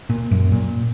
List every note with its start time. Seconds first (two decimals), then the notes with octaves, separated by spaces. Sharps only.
0.10 A#2
0.31 F#2
0.52 A#2